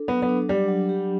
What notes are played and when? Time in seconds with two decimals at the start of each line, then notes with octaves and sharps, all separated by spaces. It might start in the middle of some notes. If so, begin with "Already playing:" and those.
Already playing: D4 A4
0.08 F#3 B3
0.22 B3
0.29 D4
0.49 F#3 G3
0.68 F#3
0.89 G4